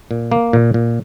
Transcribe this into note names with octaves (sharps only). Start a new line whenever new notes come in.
A#2
A#3
A#2
A#2